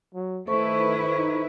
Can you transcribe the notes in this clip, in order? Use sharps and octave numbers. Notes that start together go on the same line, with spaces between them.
F#3
D#3 A3 E4 A4 B4 C5 C#6
D#4